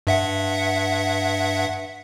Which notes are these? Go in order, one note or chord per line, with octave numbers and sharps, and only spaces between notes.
G2 E5 F#5